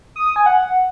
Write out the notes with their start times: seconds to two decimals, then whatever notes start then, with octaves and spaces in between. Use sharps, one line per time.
0.16 D#6
0.26 D#6
0.36 G#5
0.46 F#5